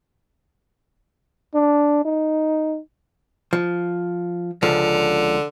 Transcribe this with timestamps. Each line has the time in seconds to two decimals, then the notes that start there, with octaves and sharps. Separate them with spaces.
1.54 D4
2.05 D#4
3.53 F3
4.63 C#2 D3 F3